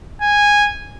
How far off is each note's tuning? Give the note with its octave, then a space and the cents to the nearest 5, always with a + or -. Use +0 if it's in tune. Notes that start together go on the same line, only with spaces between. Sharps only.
G#5 -10